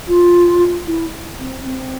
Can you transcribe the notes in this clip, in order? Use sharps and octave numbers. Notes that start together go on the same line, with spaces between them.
F4
E4
C4
C4